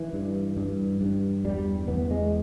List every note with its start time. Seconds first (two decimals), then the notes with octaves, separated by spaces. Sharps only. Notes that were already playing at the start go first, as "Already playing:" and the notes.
Already playing: E3
0.13 G2
0.57 G2
1.01 G2
1.44 E2 G3
1.88 E2 B3
2.11 G#3